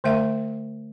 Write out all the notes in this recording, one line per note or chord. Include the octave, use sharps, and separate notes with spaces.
D3 A3 A#4 E5 F5 A5